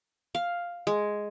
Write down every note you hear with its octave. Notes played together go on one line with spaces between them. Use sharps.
F5
G#3